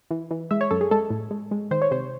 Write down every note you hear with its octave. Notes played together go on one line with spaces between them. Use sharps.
E3
E3
G#3 E5
C#5
F#2 A4
G#4
G#3 A4
A2
G#3
G#3
D#3 C5
C#5
C3 C5